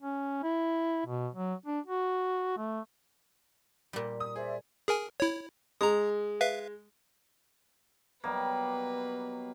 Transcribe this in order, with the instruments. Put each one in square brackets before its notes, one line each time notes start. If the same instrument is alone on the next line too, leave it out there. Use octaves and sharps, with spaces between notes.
[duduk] C#4
E4
B2
F#3
D4
F#4
A3
[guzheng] A#2 G3
[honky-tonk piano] D#6
[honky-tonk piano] G#4 [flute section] C5 D5 E5
[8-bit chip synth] G#4 A#4 G#5
E4 C#5
[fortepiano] G#3 [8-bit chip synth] A#5 D#6
[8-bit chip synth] B4 E5 F5
[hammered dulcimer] B2 F#3 G3 [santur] A#3 [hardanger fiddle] B4